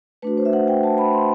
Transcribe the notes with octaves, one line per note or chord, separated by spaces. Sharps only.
A3 D4 F#4 B4
C5
E5
F#5
G5
A5
B5
C6